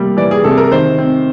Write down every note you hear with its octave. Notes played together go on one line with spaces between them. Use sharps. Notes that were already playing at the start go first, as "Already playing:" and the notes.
Already playing: C3 G3 A#3
E3 D5
G#4
C3 A4
A#4
D#3 C5
C4